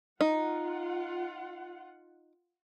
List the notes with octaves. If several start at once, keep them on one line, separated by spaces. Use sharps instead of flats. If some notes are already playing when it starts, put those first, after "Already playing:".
D#4 F4 F#5